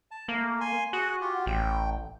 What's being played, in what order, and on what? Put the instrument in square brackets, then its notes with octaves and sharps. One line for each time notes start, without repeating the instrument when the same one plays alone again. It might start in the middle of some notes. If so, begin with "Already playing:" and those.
[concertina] A5
[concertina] A3 [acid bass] A#3
[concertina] G#5 C6
[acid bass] F#4 [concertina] G#4 G#5 F#6
[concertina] F4 G4
[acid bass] A1 [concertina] G5